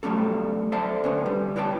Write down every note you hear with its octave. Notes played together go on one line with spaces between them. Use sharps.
F#3 G3 A3 C#4 A4
A4 C5 D5 E5 F#5 A5
D3 C#4 B4
G3
E4 B4 C#5 G5 A5